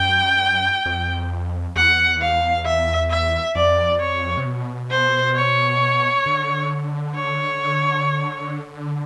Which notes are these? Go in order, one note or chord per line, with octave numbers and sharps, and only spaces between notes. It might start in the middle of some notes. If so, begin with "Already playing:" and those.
Already playing: F#2 G5
F2
E2 F#5
F5
E5
E5
F2 D5
C#5
C3
B2
C5
C#5
D3
C#5